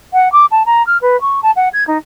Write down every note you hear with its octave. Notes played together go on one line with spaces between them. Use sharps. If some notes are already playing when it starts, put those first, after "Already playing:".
F#5
D6
A5
A#5
F6
B4
C#6
A5
F#5
G#6
D#4